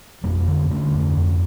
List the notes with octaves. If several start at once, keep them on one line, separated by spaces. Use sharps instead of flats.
F2 G3 A#3
D3
D3 A3 C#4
F2
F2